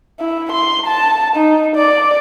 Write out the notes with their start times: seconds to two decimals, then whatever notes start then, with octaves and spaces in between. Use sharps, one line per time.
0.20 E4
0.52 C6
0.86 A5
1.36 D#4
1.76 D5